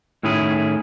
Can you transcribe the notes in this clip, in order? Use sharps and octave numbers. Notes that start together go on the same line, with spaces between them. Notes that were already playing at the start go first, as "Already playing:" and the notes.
A2 D#3 C#4 E4 G#4